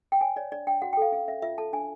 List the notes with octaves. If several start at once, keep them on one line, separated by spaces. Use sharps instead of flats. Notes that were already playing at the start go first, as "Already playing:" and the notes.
G5
C#5 G#5
C#5 D5
D4 D5
D4 G5
F#4 F#5
G5
A4 F5
C#4 F5
C#4 E5
F4 E5
A4 A5
D4 G#5